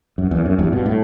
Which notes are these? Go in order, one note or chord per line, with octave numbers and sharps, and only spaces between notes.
F#2
E2
F#2
E2 G2
G2 B2
A2